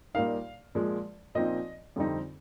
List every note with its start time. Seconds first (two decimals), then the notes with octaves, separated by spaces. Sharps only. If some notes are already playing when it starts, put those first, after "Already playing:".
0.14 A#2 G3 A#3 D#4 F5
0.75 A#2 F3 G#3
1.35 A#2 F3 C4 D#4 D#5
1.96 F2 D3 G3 C4 D#4